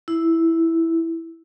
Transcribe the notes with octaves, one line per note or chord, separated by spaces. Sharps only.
E4